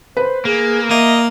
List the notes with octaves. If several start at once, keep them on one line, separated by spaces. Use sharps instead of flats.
B4 C5
A#3 G#4
A#3 D#5 E5